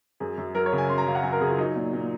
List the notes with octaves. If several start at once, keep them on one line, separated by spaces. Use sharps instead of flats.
F#2 G#4
F#2
F#3 A#4
C#5
C#3
G#5
F#2 C6
A#5
F#2 F5
F#5
F#3 G#5
A#4
C#3 G#4
F4
F#3 D#4
A#2
A#2